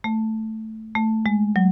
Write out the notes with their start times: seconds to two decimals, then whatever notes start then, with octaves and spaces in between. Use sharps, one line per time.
0.04 A3
0.95 A3
1.26 G#3
1.56 F#3